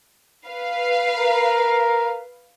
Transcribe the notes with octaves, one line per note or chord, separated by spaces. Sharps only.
B4 F5
A#4